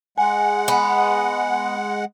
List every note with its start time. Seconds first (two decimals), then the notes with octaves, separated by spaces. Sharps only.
0.18 G#3 F#5 G#5
0.68 B3